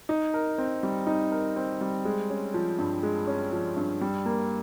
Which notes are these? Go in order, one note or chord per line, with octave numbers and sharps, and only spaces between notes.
D#4
A#4
C4
G3
D#4
A#4
C4
G3
G#3
C#4
F3
G2
G#3
C#4
F3
G2
G3
A#3